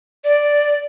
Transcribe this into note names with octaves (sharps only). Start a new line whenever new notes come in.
D5